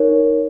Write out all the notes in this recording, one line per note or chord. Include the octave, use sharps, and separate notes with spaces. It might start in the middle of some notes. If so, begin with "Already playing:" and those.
Already playing: D#4 A#4 C#5